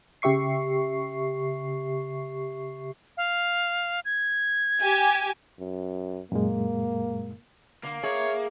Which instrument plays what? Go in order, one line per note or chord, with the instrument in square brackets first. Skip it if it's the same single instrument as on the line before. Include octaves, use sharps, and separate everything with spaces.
[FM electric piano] C#3 G4 E5 C#6 C7
[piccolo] F5
G#6
[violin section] G4 G#5
[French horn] F#2
[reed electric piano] F#2 A#2 G#3 [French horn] A#3
[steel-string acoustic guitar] D3 [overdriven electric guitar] A#3
[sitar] G#4 [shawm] C#5 [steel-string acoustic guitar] E5